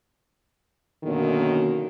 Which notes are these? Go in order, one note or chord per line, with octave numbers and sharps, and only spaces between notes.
F#2 B2 D3 D#3 F#3 A#3